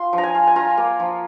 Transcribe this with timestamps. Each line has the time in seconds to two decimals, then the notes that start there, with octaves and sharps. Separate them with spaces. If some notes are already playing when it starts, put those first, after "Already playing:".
Already playing: F4 C6
0.13 F3
0.18 A#5
0.23 G#5
0.35 F4
0.47 G#5
0.56 F4 A#5
0.78 A#3
1.00 F3